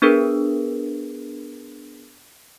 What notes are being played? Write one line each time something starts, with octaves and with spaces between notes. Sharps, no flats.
B3 D4 G#4 A#4 B4